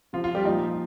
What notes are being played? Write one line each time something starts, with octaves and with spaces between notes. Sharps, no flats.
C3 F3 F4
F4
G3 G4
A#2 F3 D#4